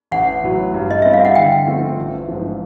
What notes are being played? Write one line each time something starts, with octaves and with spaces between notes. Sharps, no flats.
A1 F#5
A2 F#3
G2
D#5
E3 G3 C4 E5
F5
F#5
D3 G5
F3 A3 C4 F4
A1
G#2 F3